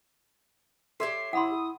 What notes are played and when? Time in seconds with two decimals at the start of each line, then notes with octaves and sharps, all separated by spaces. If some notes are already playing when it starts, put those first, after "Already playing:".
1.00 G4 A4 C#5 E5 C6 C7
1.33 E4 F#5 B5 C6 D#6